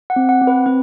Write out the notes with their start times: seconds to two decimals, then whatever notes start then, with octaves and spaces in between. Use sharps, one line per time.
0.10 F#5
0.16 C4
0.29 F#5
0.42 C4
0.47 B4
0.66 C4 B4